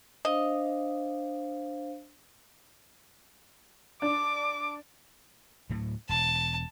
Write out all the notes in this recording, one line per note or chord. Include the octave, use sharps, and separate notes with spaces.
D4 C5 D#5 F5
D4 D6
D2 A2 F#3
E1 A5